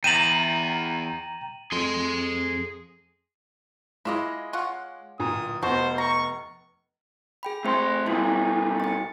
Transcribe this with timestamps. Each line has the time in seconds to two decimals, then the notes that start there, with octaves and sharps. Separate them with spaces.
0.04 E2 G5 A#5 A6 D#7 E7 F#7
1.72 F2 G#4 C6
4.05 G#3 E4 F4 D#5 D6
4.53 C#4 F4 F#5
5.20 D1 A#2 A#5 D#6
5.62 F1 B3 F#4 C5 A5
5.98 A#5 C#6
7.43 G#4 G5 B5
7.65 A3 C4 C5 C6
8.06 B2 G3 E4 F4
8.80 A6 C#7